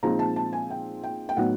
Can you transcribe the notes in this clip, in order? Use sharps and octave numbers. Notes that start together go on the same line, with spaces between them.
A#2 F3 G#3 C4 D#4 A#5
A5
A5
G#5
G5
G5
G5
A2 F#3 B3 D#4 F#5